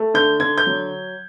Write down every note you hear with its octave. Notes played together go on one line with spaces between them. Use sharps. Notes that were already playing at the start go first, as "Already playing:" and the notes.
Already playing: A3
D3 G6
D3 G#6
G6
F#3